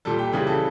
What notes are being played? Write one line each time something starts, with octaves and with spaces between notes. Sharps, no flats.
A#2 G3 A4
G5
C#3 E3 G3 G5
A4